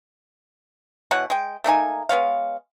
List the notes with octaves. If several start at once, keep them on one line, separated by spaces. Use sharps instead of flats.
B2 E3 C#5 F#5
G#3 G5
A3 A#3 D#4 G#5
G#3 B3 C#5 F5